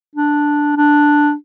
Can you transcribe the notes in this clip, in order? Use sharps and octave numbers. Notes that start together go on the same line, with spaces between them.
D4
D4